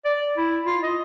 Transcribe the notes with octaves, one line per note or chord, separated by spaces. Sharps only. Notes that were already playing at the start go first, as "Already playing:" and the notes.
D5
E4
F4
D#5